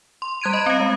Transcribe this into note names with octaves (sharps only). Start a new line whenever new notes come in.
C6
G3 F#6 G#6 D7 D#7
D#5 B5
C4 F5
G#3